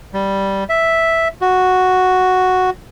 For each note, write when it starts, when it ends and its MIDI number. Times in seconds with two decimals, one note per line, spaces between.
0.14 0.64 55
0.69 1.28 76
1.41 2.70 66